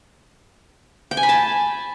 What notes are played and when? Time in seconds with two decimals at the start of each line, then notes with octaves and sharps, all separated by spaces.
1.11 G5
1.17 G#5
1.23 B5
1.29 A5